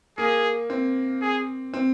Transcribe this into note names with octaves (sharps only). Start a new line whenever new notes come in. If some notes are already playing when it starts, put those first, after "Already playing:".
A#3 G#4
C4
G#4
C4